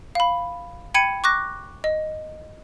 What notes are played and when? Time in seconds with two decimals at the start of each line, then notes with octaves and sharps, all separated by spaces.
0.15 F5 B5
0.94 G5 B5 G#6 C#7 D#7
1.24 C#6 D6 F#6 A#6
1.84 D#5